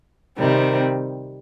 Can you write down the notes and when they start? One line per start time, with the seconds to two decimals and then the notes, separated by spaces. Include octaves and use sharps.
0.37 C3 D#3 G3 C4